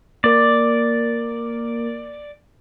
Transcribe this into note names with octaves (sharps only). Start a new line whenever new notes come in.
A#3 A#4 D5